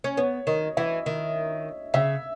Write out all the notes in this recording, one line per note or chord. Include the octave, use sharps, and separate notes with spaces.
C#4
B3 C#5
D#3 D#5
E3 E5
D#3
C#3 E5